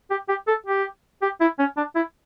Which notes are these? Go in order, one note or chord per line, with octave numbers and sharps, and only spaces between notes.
G4
G4
A4
G4
G4
E4
C#4
D4
E4